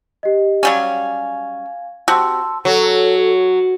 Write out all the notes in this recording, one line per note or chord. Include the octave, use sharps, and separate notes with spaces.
G4 D#5
F#3 G3 C#4 F5 G#5 G#6
C4 F#4 G4 A5 C6 E6
F#3 A4